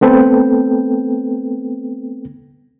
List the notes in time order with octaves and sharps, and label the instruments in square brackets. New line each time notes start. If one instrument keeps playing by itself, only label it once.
[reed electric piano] A3 B3 C4 A4 B4 G5